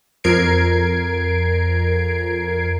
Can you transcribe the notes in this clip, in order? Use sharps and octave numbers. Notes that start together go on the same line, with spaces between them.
F2 A#4 G#6 C7 D7